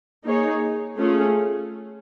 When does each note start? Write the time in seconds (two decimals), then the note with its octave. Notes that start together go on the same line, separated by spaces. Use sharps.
0.25 A#3 D#4 G#4 C#5
0.99 A3 C#4 F4 G#4